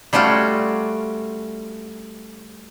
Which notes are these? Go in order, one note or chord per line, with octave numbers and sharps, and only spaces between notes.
G3 A3 C#4 F4 F#4